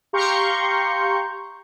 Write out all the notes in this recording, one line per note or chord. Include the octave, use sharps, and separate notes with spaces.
G4 F5 A#5 C6 C#6 G6